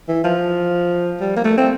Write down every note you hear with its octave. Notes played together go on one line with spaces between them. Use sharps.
E3
F3
G3
A#3
A3
C4